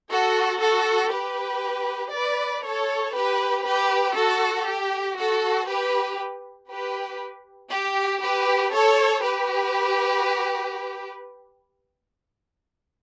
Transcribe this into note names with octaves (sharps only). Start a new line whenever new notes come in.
F#4 A4
F#4 A4
G4 B4
B4 D5
A4 C#5
G4 B4
G4 B4
F#4 A4
G4
F#4 A4
G4 B4
G4 B4
G4
G4 B4
A4 C#5
G4 B4